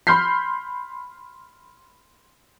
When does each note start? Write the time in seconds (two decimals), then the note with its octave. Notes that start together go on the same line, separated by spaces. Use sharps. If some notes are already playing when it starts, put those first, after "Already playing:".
0.07 B5 C6 F6 G6 B6 C7